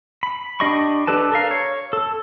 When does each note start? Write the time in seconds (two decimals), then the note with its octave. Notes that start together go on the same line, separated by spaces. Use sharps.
0.23 B5
0.60 D4 G4 D#5 B5 C#6
1.07 D4 G4 A4 B4 A5
1.32 A4 A#4 F5
1.51 C#5
1.93 A4